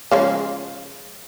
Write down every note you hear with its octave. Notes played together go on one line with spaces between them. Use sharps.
C#3 F3 G#3